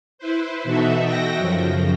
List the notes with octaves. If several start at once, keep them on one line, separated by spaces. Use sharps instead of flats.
E4 B4 C5
B2 E3 D#4 F#4 A4 E5
F#4 G5 A#6
F#2 C#3 F3